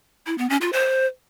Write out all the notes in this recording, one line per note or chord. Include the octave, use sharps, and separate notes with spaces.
E4
B3
C#4
F4
C5